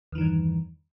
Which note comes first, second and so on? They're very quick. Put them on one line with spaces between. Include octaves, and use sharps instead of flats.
E2 E3 D#3 G2